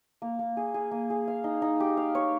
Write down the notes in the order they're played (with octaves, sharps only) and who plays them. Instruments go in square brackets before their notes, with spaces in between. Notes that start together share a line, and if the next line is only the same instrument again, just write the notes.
[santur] A#3
A#3
G#4
G#4
A#3
G#4
F5
D#4
D#4
G4
F5
C#5